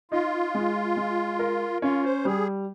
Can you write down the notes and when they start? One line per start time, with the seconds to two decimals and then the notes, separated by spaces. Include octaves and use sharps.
0.11 D#4 F4
0.55 G#3
0.97 G#3
1.39 A#4
1.82 C#4 F4
2.04 C5
2.25 G3 G#4